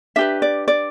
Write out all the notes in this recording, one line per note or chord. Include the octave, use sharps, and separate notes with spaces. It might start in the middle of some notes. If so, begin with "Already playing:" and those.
D4 G4 B4 E5
D5
D5